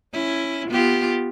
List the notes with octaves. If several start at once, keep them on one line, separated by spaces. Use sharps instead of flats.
C#4 E4
B3 F4 G4